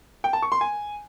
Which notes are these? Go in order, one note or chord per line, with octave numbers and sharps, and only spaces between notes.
G5
A5
C#6
C6
G#5